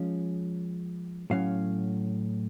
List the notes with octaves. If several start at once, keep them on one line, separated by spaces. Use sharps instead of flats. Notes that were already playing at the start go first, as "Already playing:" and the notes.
Already playing: F3 G#3 C#4
A2 F#3 C#4 F5